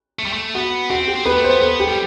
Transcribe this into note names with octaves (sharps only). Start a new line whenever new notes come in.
A3
G3
A3
B3 F#4
C4 F#4
G4
C4
B3 B4
A3
C5
B3
B3 A4
G4
G3